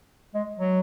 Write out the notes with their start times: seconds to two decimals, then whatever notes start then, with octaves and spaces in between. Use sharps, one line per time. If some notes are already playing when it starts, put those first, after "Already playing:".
0.35 G#3
0.59 F#3